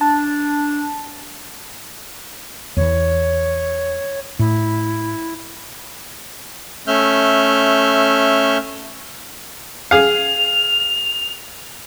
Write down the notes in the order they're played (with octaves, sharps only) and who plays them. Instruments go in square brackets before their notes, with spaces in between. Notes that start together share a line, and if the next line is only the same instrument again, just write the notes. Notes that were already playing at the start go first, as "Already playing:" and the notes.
[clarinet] D4 [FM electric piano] A5
[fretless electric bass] E2 E3 [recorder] C#5
[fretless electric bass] A2 [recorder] E4
[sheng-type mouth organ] A3 C#4 E5 F6 G6
[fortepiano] G#4 F5 [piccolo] F7